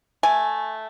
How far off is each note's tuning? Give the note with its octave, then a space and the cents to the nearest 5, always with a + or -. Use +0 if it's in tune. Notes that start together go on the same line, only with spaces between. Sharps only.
A3 -5 G#5 +0